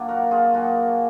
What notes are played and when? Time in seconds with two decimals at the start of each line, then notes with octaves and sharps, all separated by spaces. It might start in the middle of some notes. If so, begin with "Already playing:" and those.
Already playing: A#2 F#3 A#3 D4
0.08 F#4 A#4
0.31 F4 G#4
0.54 A#2 F#3 A#3 D4 F#4